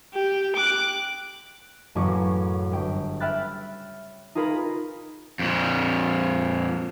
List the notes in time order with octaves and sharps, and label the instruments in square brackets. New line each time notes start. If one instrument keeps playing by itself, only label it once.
[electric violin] G4
D6 F#6
[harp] A1 F#2 C#3 A#3 C#6 D6
G1 G5
E5 G5 B5 F6 F#6 A6
D#4 F4 G#4 A#4 B5
[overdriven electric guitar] F2 A#2